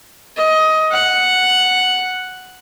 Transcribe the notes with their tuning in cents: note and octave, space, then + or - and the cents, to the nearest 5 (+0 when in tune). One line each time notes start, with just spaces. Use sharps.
D#5 +20
F#5 +0